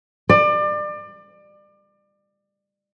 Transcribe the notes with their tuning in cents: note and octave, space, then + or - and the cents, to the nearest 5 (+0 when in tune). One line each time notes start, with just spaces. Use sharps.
D5 +30